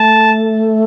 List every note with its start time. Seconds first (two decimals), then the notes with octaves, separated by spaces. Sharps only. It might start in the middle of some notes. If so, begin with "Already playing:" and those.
Already playing: A3 A5